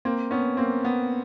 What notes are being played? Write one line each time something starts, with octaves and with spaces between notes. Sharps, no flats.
A#3 C4
B3 C#4
A#3 C4
B3